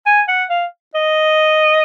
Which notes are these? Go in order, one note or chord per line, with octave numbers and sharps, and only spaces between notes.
G#5
F#5
F5
D#5